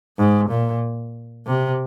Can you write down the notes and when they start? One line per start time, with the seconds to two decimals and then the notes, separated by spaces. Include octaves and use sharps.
0.18 G#2
0.50 A#2
1.47 C3